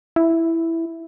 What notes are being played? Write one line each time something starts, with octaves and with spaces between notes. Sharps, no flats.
E4